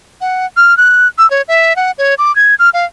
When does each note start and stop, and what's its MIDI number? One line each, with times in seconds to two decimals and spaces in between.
0.21 0.46 78
0.57 0.77 89
0.78 1.07 90
1.18 1.29 88
1.30 1.42 73
1.48 1.76 76
1.76 1.91 78
1.98 2.14 73
2.18 2.34 86
2.36 2.55 92
2.59 2.70 89
2.74 2.85 77